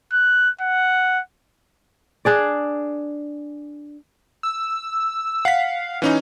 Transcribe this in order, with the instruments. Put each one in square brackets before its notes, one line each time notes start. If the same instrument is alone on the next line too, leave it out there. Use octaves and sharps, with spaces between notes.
[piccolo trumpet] F#6
F#5
[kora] D4 G#4 D5
[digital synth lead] E6
[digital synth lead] F5 [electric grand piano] F#5 B6
[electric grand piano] E3 C#4 D#4